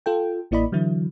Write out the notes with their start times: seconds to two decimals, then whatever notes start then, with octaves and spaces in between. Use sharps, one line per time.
0.06 F4 A4 G5
0.51 A1 A#3 E4 D5 D#5 B5
0.72 D3 E3 F#3 E4